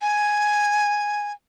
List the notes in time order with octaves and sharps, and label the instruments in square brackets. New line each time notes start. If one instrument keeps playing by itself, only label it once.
[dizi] G#5